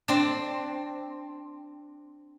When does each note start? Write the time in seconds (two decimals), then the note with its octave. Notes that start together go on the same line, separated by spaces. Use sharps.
0.08 C4 D4